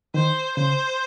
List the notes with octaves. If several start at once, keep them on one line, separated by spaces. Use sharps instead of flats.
D#3 C5
C#3 C5